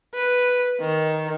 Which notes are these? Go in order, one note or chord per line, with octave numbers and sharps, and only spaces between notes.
B4
D#3